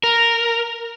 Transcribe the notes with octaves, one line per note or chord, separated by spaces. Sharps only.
A#4